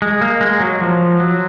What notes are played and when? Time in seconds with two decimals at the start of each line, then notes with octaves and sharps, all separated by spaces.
0.02 G#3
0.21 A#3
0.41 G#3
0.61 F#3
0.81 F3
1.20 F#3